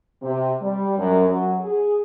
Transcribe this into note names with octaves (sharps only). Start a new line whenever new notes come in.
C3
G3
F#2
F#3
G#4